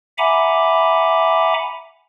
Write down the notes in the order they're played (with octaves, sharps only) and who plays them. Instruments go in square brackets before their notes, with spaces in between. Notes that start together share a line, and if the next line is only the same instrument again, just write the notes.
[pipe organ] E5 F#5 G#5 A#5 B5 D6